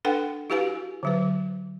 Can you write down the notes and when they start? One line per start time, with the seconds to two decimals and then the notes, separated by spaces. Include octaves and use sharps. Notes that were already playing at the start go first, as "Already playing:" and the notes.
0.05 D4 A4 B4 F#5 G5
0.50 E4 F#4 G4 B4 F5 G#5
1.03 D3 F#3 B4